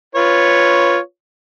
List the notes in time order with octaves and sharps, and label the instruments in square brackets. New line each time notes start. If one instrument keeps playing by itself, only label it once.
[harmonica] F4 B4 C#5